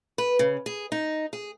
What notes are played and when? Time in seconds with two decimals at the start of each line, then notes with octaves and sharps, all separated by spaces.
0.18 B4
0.39 C#3
0.66 G#4
0.92 D#4
1.33 G#4